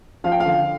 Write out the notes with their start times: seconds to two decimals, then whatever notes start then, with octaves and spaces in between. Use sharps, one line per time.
0.24 F3 F5
0.32 G5
0.40 F5
0.45 D3